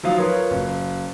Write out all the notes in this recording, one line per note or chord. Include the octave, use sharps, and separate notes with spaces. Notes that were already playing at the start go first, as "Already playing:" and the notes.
F3 F#3 D#4 F5 D#6
F4 A#4 B4 C#5
F#1